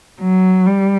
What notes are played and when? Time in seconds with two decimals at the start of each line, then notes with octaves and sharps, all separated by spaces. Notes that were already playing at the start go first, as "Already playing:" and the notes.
0.21 F#3
0.67 G3